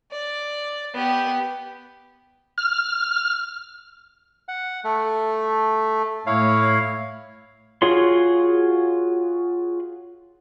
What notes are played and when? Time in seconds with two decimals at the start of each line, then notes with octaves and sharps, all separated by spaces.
0.12 D5
0.94 B3 G4
2.58 F6
4.48 F#5
4.84 A3
6.27 A2 E4 C#5 F5
7.82 F4 F#4 G#4 C#5 C6